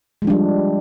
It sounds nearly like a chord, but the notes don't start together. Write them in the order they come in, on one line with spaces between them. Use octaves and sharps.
G#3 F3 D4 G3